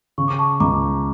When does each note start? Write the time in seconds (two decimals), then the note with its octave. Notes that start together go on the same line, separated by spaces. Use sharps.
0.18 C#3 C#6
0.28 D6
0.39 A5 C#6
0.60 C#2 A#5 D6